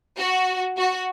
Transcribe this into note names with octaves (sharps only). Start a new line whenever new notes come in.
F#4
F#4